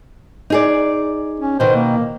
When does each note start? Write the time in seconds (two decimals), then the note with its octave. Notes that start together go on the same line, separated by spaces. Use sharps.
0.50 D#4 G#4 D5
1.40 C#4
1.60 B2 D#3 C5
1.75 A#3